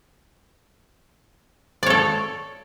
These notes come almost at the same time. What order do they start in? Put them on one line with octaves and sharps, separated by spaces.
D5 C#5 A4